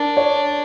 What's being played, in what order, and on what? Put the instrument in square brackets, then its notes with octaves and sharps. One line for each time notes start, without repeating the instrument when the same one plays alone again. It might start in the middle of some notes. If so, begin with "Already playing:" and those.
Already playing: [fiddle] D4 [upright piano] A#4
[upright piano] C#5